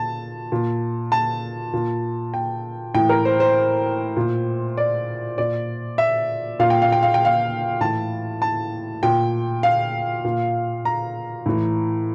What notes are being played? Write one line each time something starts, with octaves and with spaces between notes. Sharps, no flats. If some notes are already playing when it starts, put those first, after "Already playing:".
Already playing: A#2 A5
A#2
A5
A#2
G5
A2 E3 G5
A#4
C5
C5
A#2
D5
A#2 D5
E5
A#2 F5
G5
F5
G5
F5
G5
F5
A2 E3 A5
A5
A#2 G5
F5
A#2
A#5
A2 E3